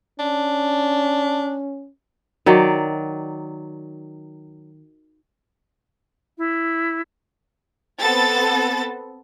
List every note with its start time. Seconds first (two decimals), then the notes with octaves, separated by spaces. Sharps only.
0.19 C#4 D4
2.46 D#3 F#3 D5
6.38 E4
8.00 B3 C4 A4 A6